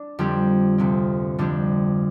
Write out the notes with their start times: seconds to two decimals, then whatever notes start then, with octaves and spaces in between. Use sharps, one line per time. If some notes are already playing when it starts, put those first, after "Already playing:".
Already playing: D4
0.19 F2 D3 G3 C4 G4
0.78 D2 C3 F3 C4
1.38 F2 D3 G3 D4 G4